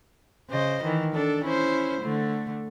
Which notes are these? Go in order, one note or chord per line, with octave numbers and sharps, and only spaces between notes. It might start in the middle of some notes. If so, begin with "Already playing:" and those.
C#3 C5 D#5
D#3 E3
D4 A4
C#4 E4 C5
D3 A3